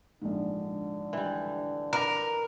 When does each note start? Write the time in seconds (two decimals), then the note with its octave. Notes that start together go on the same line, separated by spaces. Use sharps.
0.22 A#1 G#2 D3
1.13 E3 G3
1.93 A#4 B4 A#5 D6 A#6